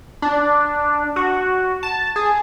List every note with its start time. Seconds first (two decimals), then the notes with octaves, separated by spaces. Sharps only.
0.22 D4
1.16 F#4
1.83 A5
2.16 G#4